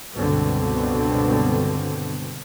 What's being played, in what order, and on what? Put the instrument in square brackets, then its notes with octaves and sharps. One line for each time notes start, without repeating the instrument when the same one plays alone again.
[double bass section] C#2 G2 B2 D3 B3 C4